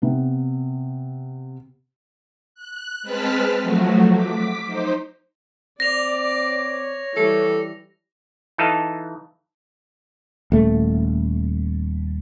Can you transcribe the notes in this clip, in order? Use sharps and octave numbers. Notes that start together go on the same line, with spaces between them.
C3 B3
F#6
G#3 C4 B4 A5 F6 B6
F3 F#3 A3 F#4
D6 B6
D#4 C5
C4 D5 A#6 F7
C#5
E3 G3 A4
E3 D#4 A4 D#5 F5 A5
D#1 A3